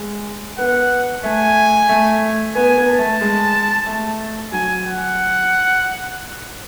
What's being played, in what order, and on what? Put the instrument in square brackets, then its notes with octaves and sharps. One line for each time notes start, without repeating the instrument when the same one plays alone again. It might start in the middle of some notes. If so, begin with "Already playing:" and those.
Already playing: [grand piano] G#3
[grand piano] B3 [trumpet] F#5
[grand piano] A3 [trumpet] G#5
[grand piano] A3
[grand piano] B3 [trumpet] G#5
[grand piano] B3
[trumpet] A5
[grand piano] A3
G#3
A3
[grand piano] F#3 [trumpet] G#5
[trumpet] F#5